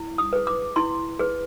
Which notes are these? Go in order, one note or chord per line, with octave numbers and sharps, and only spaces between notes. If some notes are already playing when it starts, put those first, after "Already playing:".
Already playing: E4
D#6
G#4 B4
D6
E4 C6
G#4 B4